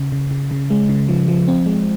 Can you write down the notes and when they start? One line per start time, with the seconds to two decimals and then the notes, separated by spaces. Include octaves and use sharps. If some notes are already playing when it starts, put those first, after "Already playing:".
Already playing: C#3
0.12 C#3
0.31 C#3
0.51 C#3
0.70 G#3
0.89 C#3
1.09 F3
1.28 F3
1.48 C4
1.66 G#3